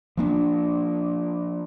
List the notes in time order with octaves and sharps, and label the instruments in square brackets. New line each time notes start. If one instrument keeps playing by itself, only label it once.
[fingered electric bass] F3 A#3 D4